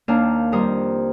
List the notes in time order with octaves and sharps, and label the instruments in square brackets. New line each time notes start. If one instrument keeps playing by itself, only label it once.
[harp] D#2 A#3 D4 F5 G5
F2 D#3 G3 A#4 C5 D#6